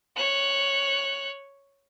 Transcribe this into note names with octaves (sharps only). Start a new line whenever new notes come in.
C#5 F#6